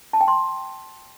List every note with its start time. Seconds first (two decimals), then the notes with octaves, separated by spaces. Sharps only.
0.13 A5
0.21 G5
0.28 C6